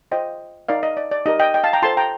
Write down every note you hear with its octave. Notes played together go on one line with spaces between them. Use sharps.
F4 C5 D#5 G5
D#4 A#4 D5 F5
D#5
D5
D5
D#4 G4 A#4 D#5
D#5 G5
D#5 G5
F5 A5
G5 A#5
F4 A4 C5 A5 C6
G5 A#5